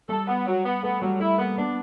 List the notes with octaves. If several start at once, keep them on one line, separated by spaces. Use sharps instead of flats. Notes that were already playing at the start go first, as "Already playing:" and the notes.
G3 A4
B3
F#3
B3
A3 B3
F#3 G3
A3 E4
A#3 B3
B3 D4